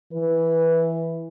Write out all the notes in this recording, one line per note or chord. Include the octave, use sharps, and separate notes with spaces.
E3 B4